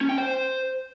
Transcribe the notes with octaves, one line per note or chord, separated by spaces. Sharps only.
C#4
G5
C5